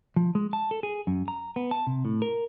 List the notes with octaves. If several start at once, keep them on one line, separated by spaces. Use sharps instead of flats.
F3
G#3
A5
A4
G#4
F#2
A#5
B3
A5
C3
A2
A#4